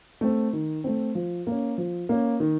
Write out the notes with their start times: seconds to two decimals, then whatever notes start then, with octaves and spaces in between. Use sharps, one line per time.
0.21 A3 C4
0.53 D#3
0.84 A3 C4
1.15 F3
1.47 A#3 C#4
1.78 F3
2.09 A#3 C#4
2.40 D#3